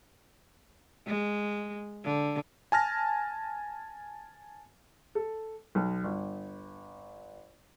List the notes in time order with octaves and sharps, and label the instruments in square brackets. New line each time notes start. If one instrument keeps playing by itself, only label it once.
[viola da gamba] G#3
D3
[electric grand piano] G#5 A5 F6 A#6
[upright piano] A4
B1
G1